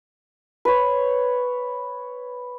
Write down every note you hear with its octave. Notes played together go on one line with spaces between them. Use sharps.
B4 C#5